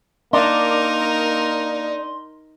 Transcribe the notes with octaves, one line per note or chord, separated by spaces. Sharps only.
A#3 D4 D#4 A#4 C6